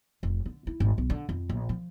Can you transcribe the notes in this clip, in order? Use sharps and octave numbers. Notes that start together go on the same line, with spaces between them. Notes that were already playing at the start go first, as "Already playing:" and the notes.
F1
D3
E4
G#1
B1
D3
F2
A#1
F3